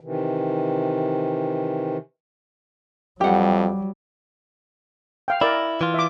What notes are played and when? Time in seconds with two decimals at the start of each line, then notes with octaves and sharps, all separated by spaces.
0.01 C3 D#3 E3
3.21 F2 F#3 G3 G4 F#5
5.28 F5 G5
5.41 E4 A#4 D5
5.81 E3 F4
5.94 E5 D6